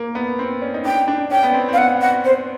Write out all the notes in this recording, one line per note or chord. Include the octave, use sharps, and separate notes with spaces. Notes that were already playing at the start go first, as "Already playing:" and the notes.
Already playing: A#3
B3
C4
C#4
D#4
D4 G5
D4
C#4 G5
B3
C4
C4
F5
B3 F#5
F#5
C5